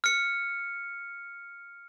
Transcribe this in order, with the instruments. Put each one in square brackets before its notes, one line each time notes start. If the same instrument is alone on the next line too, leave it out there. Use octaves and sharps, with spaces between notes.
[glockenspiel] F6 C#7